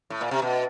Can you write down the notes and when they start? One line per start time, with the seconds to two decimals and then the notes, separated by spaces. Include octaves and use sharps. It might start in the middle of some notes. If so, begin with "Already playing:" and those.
0.10 A2
0.21 A#2
0.31 C3
0.42 B2